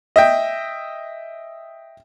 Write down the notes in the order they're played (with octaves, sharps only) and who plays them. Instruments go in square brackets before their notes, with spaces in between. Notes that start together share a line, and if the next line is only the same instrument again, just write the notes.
[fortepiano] D#5 E5 G5